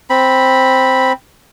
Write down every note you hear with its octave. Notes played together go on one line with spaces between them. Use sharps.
C4 B5